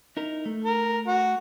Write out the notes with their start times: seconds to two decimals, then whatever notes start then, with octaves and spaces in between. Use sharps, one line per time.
0.17 D#4 E4 A#4
0.46 A3
0.64 A#4
1.08 F#4